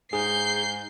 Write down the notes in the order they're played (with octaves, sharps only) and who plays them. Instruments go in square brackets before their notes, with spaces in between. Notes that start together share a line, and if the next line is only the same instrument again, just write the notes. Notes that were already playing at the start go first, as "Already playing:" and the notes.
[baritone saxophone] G#2 [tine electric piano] G#4 [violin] G6 C7